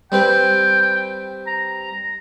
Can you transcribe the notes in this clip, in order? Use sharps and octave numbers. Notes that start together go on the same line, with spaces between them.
G3 C4 B4 G5
A#5